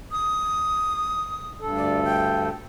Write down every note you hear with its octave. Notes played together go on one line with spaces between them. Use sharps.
D#6
D2 G2 A4
D5
G5